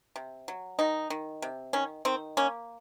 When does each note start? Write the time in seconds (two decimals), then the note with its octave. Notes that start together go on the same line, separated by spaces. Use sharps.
0.16 C3
0.48 F#3
0.79 D#3 D#4
1.10 D#3
1.42 C3
1.73 D#3 C#4
2.05 D#3 C4
2.37 A#3 C#4